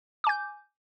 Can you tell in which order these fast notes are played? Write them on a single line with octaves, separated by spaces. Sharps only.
D6 G#5 G6